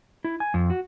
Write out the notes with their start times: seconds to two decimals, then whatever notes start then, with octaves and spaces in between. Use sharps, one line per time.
0.24 E4
0.40 G#5
0.54 F2
0.70 F#4